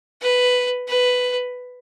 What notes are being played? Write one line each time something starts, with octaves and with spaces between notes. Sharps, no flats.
B4
B4